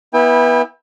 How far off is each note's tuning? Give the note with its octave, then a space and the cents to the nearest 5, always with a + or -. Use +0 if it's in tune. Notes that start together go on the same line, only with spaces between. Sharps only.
B3 -20 E4 -15 G5 +40